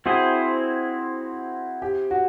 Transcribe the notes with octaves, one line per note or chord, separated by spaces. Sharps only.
C4 E4 F#4 G#4 C5
G4
F#4